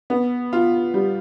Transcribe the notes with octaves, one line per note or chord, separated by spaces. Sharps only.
B3
F4
G3